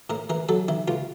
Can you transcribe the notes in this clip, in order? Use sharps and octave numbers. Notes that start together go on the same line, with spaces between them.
A2 A#4
E3 A#4
F#3 A4
D#3 E4
C#2 F4